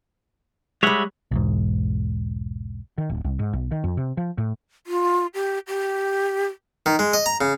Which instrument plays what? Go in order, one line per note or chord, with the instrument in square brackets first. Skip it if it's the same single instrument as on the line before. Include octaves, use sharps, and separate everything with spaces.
[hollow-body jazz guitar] G3 G#3 [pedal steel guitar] C#5 E5 F#5
[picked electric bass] B1 E2 G#2
[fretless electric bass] D#3
D1
C2
G#2
B1
D#3
F2
C3
F3
A2
[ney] F4
G4
G4
[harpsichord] D#3
G#3
D#5
A#5
C#3